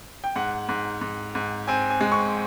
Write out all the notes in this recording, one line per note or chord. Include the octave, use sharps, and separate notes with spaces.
G5
G#2 F#5
G#2
G#2
G#2
C4 G#5
G#5
G#3
C#6